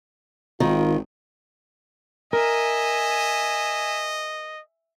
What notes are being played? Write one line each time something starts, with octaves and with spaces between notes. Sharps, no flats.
G#1 D#3 F4
A#4 D#5 E5 G#5